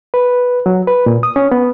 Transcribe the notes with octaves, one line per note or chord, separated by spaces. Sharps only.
B4
F#3
B4
A#2
D#6
C#4
B3